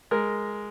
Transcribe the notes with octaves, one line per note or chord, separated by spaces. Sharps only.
G#3 A#4